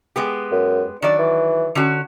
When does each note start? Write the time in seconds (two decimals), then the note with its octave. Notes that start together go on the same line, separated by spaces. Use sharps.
0.16 G#3 B3 G4
0.51 F#2
1.02 D#3 F#3 D4 D5
1.19 E3
1.75 D3 C#4 F#4